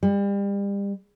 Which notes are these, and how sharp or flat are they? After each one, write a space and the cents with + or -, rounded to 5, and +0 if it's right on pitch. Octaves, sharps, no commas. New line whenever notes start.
G3 +35